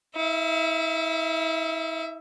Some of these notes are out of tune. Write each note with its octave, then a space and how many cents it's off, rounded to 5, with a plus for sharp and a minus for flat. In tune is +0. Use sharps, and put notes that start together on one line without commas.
E4 -40 E5 +30